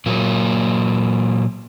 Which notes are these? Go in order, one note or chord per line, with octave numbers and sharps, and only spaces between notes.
A#2 F#3 A#3